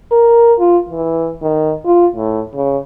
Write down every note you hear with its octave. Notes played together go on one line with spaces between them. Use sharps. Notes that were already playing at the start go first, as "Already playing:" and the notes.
A#4
F4
E3
D#3
F4
A2
C#3